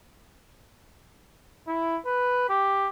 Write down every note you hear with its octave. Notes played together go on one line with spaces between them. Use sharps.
E4
B4
G4